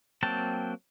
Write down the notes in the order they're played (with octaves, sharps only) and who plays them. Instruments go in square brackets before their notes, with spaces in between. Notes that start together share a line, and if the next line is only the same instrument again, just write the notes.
[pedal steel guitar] F#3 A#3 C4 G5 A5